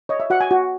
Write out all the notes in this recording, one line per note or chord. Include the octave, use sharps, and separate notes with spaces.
C#5 D#5
E5
F#4 F#5
G#5
F#4